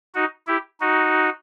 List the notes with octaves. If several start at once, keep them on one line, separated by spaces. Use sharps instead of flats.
D#4 F#4
E4 G4
D#4 F#4